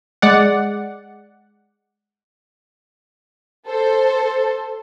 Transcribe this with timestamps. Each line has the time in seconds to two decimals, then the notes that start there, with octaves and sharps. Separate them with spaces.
0.22 G#3 D5 F#5
3.67 A4 C5